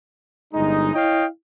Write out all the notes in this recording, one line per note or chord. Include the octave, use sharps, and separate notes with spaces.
G1 G#3 D#4
E4 C#5 D#5 F5 G5